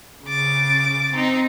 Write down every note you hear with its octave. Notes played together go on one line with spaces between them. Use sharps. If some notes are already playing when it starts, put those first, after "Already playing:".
C#3 D6 A6
C4 D#4